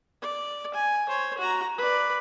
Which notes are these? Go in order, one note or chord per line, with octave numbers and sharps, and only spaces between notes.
D5
G#5
C5 C#5
F#4 A#5
B4 D5